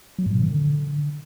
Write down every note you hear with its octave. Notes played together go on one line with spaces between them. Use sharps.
F#3
G#2
B2
D#3
D3